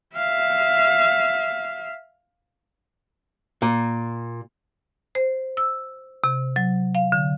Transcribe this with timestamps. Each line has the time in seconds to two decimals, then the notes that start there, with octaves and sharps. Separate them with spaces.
0.16 E5 F5
3.62 A#2
5.15 C5
5.57 E6
6.24 C3
6.56 F#3
6.95 F5
7.12 D3